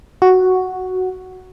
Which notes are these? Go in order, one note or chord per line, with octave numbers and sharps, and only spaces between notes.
F#4